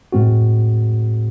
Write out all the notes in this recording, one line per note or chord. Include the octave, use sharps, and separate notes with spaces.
A2 G#3 C4 F#4